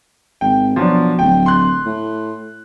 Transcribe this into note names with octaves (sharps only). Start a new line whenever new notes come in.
G#1 G5
B2 F3 F#3 D4
D1 G5
C6 F#6
A2